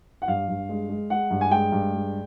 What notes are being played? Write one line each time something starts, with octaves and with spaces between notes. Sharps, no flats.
F#5
G2 F5
G2
G#3
G#3
G#3 F#5
G2
G#5
G#3 G5
G2
G#3